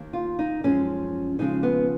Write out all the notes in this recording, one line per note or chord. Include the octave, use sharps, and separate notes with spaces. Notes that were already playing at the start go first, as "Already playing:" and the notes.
Already playing: D#2 D#3 A#3
F4
D#4
F#2 F3 G#3 C#4
D#2 C#3 F3 G#3 D#4
B3